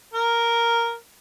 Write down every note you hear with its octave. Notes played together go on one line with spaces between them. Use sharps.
A#4